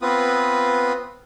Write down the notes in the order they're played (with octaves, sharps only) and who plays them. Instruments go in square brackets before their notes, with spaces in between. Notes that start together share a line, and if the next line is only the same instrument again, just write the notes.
[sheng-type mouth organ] B3 C4 F4 B4 D#6